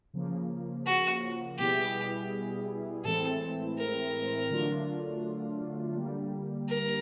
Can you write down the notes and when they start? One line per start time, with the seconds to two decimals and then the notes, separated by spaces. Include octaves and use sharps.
0.14 C#3 F3 A#3
0.86 F#4
1.59 B2 G3 B3 E4 G4 G#4
3.04 A2 E3 G#3 C4 E4 A4
3.78 A#4
4.50 D3 F#3 A3 D4 F4
5.95 D3 G3 A#3
6.69 A#4